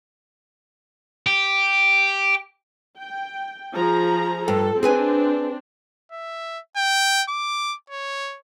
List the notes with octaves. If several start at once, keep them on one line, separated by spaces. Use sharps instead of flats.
G4
G5
F3 G#4 A#5
G2 A4
C4 D4 G#4 B4 G#5
E5
G5
D6
C#5